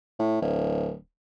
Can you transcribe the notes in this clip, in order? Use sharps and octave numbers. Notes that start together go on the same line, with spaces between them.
A2
D1